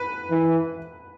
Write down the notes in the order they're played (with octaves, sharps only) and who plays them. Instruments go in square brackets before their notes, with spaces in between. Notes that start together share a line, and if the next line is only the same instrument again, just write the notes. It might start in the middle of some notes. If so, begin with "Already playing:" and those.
Already playing: [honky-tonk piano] B4
[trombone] E3